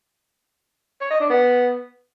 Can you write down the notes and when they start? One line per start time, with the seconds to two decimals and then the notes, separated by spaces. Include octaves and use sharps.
1.01 C#5
1.11 D#5
1.20 D4
1.30 B3